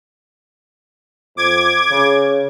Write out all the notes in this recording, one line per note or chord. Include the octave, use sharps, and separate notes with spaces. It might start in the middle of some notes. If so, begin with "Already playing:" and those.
F2 D6 G#6
C#3